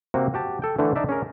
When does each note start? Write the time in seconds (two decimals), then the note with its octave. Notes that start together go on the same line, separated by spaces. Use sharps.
0.14 C3 A#3 C4 F#4
0.34 F#4 G4 A5
0.62 A4 G5
0.79 D3 E3 A3 D4
0.96 D4 D#4 D5 E5
1.09 C#4 G#4 A#4